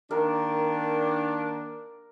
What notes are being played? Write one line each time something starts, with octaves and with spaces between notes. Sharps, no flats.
D#3 A#3 D4 A#4